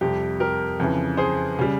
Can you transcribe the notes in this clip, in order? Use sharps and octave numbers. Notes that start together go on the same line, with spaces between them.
F2 C3 G3 G4
G4 A#4
F2 C#3 E3
G#4 C5
C#3 G3